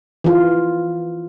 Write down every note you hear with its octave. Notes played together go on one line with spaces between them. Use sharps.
E3 F4